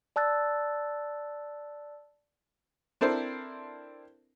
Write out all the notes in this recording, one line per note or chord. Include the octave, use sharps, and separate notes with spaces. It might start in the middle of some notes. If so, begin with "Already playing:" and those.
D5 A5 E6 F#6 A6
C4 D4 E4 A4 A#4 C5